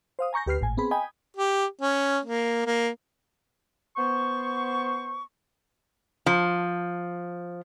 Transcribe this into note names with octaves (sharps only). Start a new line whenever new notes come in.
C5 F5 D#6
G#5 A#5 C#6 G6 A#6
D2 G4 B4 F6 C7
G#1 A2 G#5
B3 C4 G#4 B5
D#5 G5 G#5 B5 D#6
G4
C#4
A#3
A#3
B3 C5 C#6
F3